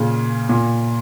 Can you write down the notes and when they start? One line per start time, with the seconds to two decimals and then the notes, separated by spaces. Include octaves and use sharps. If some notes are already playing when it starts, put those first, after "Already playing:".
Already playing: A#2 C#3
0.49 A#2